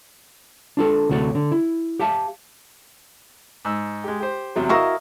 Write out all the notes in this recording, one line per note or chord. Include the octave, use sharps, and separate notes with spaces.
D4 F4 A4
D2 C3 A3 F#4 C#5 D5
D3
E4
G4 E5 F5 A5
G#2 E6
G#3 G4
G4 C5
E2 C3 F#3
E4 F#4 A#4 D#5 F5